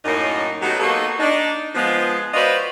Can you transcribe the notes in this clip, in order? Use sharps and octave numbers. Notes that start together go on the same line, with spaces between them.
F#2 A2 A#3 D#4
F#3 A3 B3 D#4 G4
A#3 B3 D#4 F#4 A4
D4 D#4
F3 G#3 B3
F4 F#4 B4 C5 D5 D#5